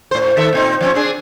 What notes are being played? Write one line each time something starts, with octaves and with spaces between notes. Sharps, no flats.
A2 C5
D#3 A4 E5
A#2 C4 D#4
F3 C4 C#4
C4 D4 G#4